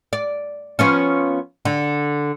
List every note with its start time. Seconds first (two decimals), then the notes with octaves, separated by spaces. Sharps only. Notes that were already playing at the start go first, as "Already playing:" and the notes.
0.13 D5
0.79 F3 B3 C#4
1.65 D3